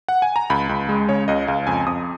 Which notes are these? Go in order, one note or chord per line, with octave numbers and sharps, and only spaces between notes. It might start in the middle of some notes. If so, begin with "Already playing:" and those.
F#5
G#5
A#5
C#2 B5
C#2
G#3
C#3 C#5
C#2 D#5
C#2 F5
F2 G#5
F2 D#6